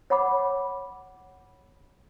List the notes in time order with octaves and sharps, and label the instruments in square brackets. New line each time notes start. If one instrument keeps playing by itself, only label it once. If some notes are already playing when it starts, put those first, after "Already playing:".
[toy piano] C#5 F#5 B5 D6